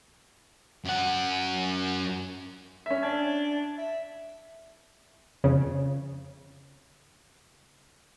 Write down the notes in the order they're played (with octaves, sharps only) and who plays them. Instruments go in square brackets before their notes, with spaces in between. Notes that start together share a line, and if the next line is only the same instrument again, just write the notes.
[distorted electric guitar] F#2 F#5
[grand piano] C#4 E5
[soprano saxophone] D4 [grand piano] G#6
[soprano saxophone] E5
[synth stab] F2 C#3